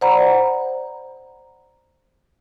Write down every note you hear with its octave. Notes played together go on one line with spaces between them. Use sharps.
C5 D5 F#5 A#5 B5